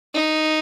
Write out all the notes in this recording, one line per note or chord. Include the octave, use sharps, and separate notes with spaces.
D#4